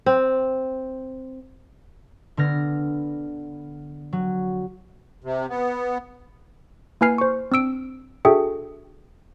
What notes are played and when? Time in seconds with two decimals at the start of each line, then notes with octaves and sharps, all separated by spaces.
0.06 C4
2.37 D3 B3 F6 A#6
4.13 F#3
5.24 C3
5.49 B3
7.01 A#3 E4 B4 G#5 F6 C7
7.18 C5 C#6
7.52 C4 D4 E6 D7
8.25 D4 F#4 G#4 A4 E5 G5